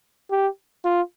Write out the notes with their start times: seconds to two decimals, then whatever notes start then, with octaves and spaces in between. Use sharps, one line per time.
0.31 G4
0.85 F4